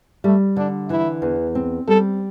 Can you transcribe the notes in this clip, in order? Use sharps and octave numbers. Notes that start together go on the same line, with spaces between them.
G3 A3
D3 D4
E3 E4
E2
C4
G3 A4